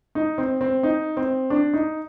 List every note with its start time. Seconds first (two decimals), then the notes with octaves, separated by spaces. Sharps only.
0.15 D#4
0.38 C4
0.61 C4
0.83 D#4
1.17 C4
1.50 D4
1.74 D#4